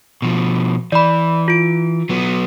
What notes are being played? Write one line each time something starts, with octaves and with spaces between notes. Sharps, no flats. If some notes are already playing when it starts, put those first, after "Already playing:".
B2 F3
E3 D5 B5
F4 D7
F#3 B3